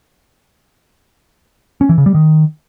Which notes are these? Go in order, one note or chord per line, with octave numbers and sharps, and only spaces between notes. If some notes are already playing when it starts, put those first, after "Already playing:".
C#4
E3
C#3
G3
D#3